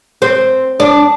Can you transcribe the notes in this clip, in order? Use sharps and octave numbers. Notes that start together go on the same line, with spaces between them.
C4
D4